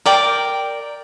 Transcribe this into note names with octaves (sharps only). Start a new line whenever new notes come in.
A#4 D5 G5